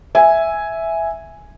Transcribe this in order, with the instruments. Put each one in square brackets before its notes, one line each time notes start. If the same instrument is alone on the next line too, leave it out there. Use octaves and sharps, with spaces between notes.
[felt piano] E5 G#5